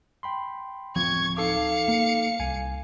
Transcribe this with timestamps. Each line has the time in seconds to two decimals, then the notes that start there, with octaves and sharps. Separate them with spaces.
0.23 G5 B5 C6
0.96 D1 F3 C4 C#6 G#6
1.37 D#4 A4 F5 D6 C#7
1.88 A#3
2.40 C2 G#5